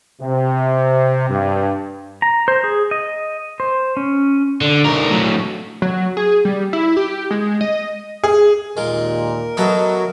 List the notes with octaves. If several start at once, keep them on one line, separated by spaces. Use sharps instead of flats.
C3
G2
A#5
C5
G#4
D#5
C5
C#4
D3
B1 A#4
A2 F#3
F#3
G#4
G3
E4
G4
G#3
D#5
G#4
D#2 A#2 G#3 F4 A#4
F#3 A3 B3 A4 D#5